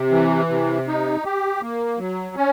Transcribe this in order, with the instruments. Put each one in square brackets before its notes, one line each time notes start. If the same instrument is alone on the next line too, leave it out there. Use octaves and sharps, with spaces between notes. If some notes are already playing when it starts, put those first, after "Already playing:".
Already playing: [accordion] C3
E3
C3
D#4
G4
A#3
F#3
C#4